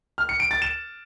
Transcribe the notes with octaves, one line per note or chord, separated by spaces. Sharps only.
F6
C#7
D7
A6
E7